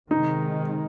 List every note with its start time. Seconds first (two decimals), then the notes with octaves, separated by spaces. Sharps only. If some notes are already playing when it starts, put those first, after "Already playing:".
0.11 C3 D#3 G#3 D#4